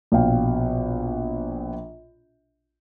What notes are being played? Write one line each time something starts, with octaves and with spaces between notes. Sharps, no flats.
A#1 B2 F5 G5